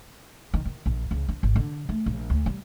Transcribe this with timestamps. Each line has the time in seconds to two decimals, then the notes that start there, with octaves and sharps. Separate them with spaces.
0.54 D#3
0.65 D#3
0.86 A#1
1.11 C#2
1.29 D4
1.43 G#1
1.56 D3
1.89 A3
2.06 A#1
2.30 D2
2.46 G3